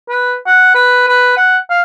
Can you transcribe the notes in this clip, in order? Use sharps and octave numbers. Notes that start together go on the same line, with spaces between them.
B4
F#5
B4
B4
F#5
F5